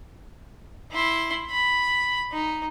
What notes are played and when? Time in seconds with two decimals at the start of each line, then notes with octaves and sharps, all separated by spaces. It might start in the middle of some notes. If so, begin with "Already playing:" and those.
0.91 E4 C6
1.50 B5
2.32 D#4